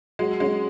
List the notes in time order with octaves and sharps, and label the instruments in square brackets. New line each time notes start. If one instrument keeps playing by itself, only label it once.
[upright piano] F#3 [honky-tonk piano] G#3
[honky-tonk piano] G#3 [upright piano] C#4